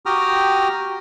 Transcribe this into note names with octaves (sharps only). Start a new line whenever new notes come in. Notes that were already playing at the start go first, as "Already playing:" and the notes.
F#4 G4 G5 A#5 D#6 F6